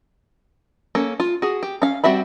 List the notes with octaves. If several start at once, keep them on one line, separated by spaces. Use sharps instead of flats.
A#3 C#4 A4
F4
F#4 G#4
G4
C#4 F5
G3 C4 F#4 E5 B5